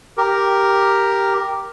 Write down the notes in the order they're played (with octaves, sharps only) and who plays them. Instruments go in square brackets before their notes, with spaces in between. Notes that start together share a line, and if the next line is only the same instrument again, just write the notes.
[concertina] G4 A#4